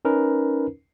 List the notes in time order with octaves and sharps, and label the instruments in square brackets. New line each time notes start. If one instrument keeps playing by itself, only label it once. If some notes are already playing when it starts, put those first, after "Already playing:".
[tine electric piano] C#4 D#4 A#4 B4